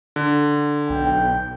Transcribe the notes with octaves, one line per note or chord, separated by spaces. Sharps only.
D3
B1 G5